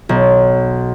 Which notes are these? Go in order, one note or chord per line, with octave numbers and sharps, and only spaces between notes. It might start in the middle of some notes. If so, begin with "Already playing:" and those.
B1